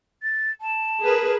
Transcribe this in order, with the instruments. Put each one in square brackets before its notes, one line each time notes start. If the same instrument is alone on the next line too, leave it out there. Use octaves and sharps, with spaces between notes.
[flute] A6
A5
[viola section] G#4 A#4 B4